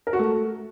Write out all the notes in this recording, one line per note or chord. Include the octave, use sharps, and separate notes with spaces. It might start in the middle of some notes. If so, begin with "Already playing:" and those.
A#4
F#4
A3